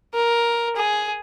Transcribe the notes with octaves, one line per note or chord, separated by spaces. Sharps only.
A#4
G#4